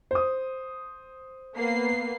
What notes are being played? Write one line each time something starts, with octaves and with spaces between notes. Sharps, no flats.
C5 D#6
A#3 B3 C7